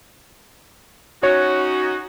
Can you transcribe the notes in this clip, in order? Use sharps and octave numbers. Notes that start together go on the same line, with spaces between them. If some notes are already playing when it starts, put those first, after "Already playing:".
C#4 D#4 F#4 C#5